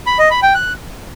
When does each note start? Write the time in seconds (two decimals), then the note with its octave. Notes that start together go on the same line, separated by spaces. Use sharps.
0.07 B5
0.19 D#5
0.31 B5
0.43 G5
0.55 F#6